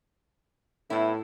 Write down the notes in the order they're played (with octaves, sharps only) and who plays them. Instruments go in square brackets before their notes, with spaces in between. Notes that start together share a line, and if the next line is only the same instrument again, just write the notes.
[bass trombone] A2 [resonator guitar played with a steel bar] B3 E4